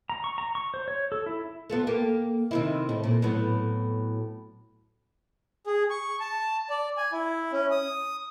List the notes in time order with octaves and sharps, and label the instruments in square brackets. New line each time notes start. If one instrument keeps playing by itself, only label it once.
[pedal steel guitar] A#5
C#6
A#5
C#6
C5
C#5
A4
E4
[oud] B3 F4 A4
A#3 G4
C3 D#3 E4
A2
A#2
A2 F#3 B3
[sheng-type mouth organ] G#4
C#6
A5
D5
G#5
E4
C#4
D#6